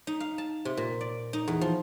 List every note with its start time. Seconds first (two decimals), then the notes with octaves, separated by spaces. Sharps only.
0.07 D#4
0.20 F5
0.38 A5
0.65 C3
0.77 A#2
1.01 D5
1.33 D#4
1.48 E2
1.61 F3